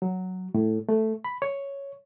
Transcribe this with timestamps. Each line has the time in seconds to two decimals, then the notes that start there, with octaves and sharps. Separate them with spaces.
0.02 F#3
0.54 A2
0.89 A3
1.25 B5
1.42 C#5